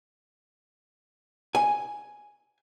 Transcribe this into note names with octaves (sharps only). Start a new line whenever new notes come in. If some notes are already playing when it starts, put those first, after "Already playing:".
G#5